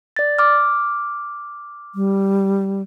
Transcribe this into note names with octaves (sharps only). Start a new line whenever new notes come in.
D5 A6
D6 F6
G3